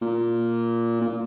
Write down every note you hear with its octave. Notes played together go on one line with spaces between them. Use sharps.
A#2
A#2